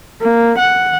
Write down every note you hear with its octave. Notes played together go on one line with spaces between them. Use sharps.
A#3
F#5